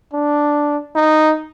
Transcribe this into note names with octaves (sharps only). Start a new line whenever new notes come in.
D4
D#4